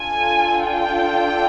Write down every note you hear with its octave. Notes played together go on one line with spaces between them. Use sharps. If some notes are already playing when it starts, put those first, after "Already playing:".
Already playing: D4 F4 A4 G#5
G5